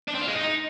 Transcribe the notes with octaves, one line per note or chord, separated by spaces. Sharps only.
D4
C4
F4
G#3
D#4